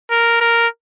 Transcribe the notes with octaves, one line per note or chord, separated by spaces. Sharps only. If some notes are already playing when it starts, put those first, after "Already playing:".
A#4
A#4